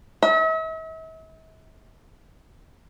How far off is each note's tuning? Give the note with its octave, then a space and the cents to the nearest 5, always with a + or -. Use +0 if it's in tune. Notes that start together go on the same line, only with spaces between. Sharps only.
E5 -45